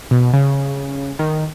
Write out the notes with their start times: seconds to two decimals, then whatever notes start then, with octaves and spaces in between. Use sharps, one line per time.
0.11 B2
0.33 C#3
1.19 D#3